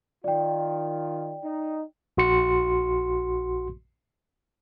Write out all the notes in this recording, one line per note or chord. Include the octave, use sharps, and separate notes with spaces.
D#3 F4 D5 G5
D#4
A#1 F#4 C6 C#7